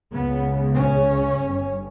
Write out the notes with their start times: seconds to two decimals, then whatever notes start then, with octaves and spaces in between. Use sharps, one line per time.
0.11 C#2 C#3 B3
0.76 C#4
1.41 G1 G2